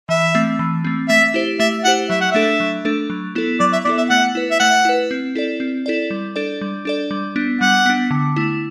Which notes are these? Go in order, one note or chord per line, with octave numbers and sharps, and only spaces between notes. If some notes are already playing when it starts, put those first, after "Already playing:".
E3 E5
A3 C4
E3
A3 C4
A3 E5
E4 G4 C5
A3 E5
E4 G4 C5 F#5
F#3 E5
F#5
A3 D4 A4 E5
F#3
A3 D4 A4
F#3
B3 E4 A4
F#3 D5
E5
B3 E4 A4 D5
E5
A3 F#5
E4 B4
E5
A3 F#5
E4 B4
C4
E4 A4 D5
C4
E4 A4 D5
G3
D4 A4 D5
G3
D4 A4 D5
G3
B3 D4
G3 F#5
B3 D4
D3
A3 E4